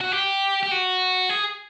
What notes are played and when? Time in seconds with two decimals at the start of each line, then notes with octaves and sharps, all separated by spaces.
0.01 F#4
0.12 G4
0.63 G4
0.71 F#4
1.29 G#4